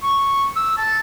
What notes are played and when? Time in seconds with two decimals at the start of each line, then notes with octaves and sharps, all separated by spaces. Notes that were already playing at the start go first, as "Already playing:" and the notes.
0.03 C#6
0.56 E6
0.78 A5